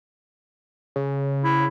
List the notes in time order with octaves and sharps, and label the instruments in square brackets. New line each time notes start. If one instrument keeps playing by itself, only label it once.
[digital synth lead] C#3
[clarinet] E4